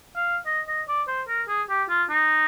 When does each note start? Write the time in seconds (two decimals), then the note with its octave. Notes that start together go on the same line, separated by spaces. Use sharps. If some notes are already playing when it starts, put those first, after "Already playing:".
0.16 F5
0.46 D#5
0.68 D#5
0.88 D5
1.08 C5
1.28 A#4
1.48 G#4
1.69 G4
1.89 F4
2.10 D#4